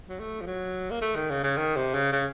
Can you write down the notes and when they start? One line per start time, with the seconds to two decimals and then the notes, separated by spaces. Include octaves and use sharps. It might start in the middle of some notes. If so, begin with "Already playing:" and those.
0.09 F#3
0.19 A3
0.41 F3
0.47 F#3
0.90 A#3
1.02 A3
1.15 D#3
1.30 C#3
1.44 C#3
1.57 D#3
1.76 C3
1.94 C#3
2.12 C#3